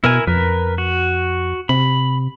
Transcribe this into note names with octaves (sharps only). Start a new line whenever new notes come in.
B2 E4 A#4 G#5
F2 A#4 B4
F#4
C3 B5